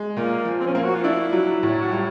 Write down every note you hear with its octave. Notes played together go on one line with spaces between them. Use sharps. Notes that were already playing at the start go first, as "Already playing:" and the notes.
Already playing: G#3
A#2 A#3
F3
C4
C#4
A#3 C4
F#4
F4
D4 E4
F#3
A2
F#4
G3 F4